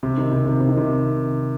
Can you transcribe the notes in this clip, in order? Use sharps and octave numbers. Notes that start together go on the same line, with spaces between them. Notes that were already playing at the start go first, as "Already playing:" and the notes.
C3
D#3
C3
C3
C3
D#3
C3